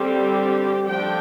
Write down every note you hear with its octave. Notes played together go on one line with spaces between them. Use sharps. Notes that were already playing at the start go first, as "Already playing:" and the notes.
Already playing: D3 G3 C4 G4
F3 A3 D4 G5